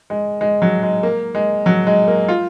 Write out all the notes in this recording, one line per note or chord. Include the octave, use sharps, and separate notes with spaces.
G#3
G#3
F#3
G#3
A#3
G#3
F#3
G#3
A#3
F4